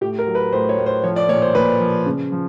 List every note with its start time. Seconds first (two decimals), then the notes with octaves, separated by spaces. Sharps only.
0.01 A2 G4
0.19 A#4
0.27 F#3
0.35 B4
0.52 A2 C5
0.69 C#5
0.78 A2
0.86 C5
1.04 F3 C#5
1.16 D5
1.29 A#2 C#5
1.42 C5
1.55 A#2 B4
1.80 F3
2.06 C#3
2.32 F3